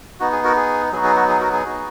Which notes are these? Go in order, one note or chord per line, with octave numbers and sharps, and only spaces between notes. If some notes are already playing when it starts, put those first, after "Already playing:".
B3 D#4 F#4
G#4
F#4 A#4
G#4
F#3 B3 D#4 F#4 G#4
G#4
F#4
G#4
F#4 A#4
G#4
B3 D#4 F#4